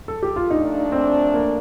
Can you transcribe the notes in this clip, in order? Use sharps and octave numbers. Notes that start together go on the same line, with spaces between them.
A4
G4
F4
A#2 F3 A3 D4 D#4
C4
A#3